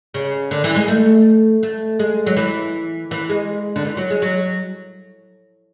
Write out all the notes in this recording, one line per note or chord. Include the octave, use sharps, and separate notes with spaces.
C#3
D3
E3
G#3
A3
A3
G#3
F#3
E3
E3
G#3
D3
E3
F#3
G#3
F#3